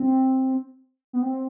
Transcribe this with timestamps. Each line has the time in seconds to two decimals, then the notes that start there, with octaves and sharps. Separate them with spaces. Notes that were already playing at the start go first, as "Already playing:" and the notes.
Already playing: C4
1.13 B3
1.22 C4